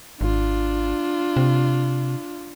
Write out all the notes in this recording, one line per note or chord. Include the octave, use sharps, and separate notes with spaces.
G#1 D4 F4
C3